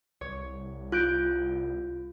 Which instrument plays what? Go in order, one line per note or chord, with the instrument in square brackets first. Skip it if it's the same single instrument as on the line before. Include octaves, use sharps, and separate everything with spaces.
[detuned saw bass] C2 [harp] C#5
[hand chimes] F4 [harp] F#6 G6 D7